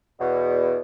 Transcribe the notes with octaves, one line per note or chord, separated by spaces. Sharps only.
E2 B2